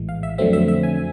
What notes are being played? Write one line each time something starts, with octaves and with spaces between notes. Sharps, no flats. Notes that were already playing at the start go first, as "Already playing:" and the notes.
Already playing: A#1 A2 E3 G#3
F5
E5
F2 D3 F#3 A3 C4 E5
E5
E5
G#5